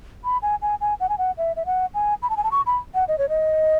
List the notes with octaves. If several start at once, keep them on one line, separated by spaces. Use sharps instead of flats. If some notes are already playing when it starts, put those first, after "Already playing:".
B5
G#5
G#5
G#5
F#5
G#5
F#5
E5
E5
F#5
G#5
B5
A5
G#5
A5
C#6
B5
F#5
D#5
C#5
D#5